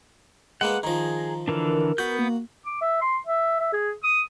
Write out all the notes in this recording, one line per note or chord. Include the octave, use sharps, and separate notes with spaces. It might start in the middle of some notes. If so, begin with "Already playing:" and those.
G#3 A#3 B3 F#5
D#3 F3 G#4 A#5
D3 E3 D4 A#4
B3 F#4 G6
A#3
D6
E5
C6
E5
E5
G#4
D#6